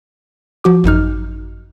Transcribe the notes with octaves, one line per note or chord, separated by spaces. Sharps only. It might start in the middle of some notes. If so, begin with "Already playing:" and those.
F3 F#4 D6
G#1 F#2 D#4 F6